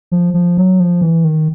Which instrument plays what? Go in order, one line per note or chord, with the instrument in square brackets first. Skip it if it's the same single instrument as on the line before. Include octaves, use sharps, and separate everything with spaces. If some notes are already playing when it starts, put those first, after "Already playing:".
[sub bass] F3
F3
F#3
F3
E3
D#3